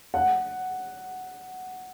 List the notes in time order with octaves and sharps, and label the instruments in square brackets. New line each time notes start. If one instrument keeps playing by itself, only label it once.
[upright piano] F#5